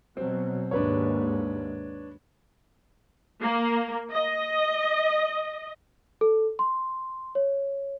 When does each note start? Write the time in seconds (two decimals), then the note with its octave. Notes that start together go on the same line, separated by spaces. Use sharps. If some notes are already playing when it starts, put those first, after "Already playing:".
0.17 B2 F#3 C4
0.71 D#2 G#2 D4 B4 C#5
3.41 A#3
4.12 D#5
6.21 A4
6.59 C6
7.35 C#5